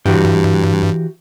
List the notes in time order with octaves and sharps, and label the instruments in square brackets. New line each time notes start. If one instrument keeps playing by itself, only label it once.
[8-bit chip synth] G2 [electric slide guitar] E3 F#4 G4